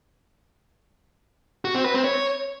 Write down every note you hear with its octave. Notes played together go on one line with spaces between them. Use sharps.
F#4
C4
B4
C4
C#5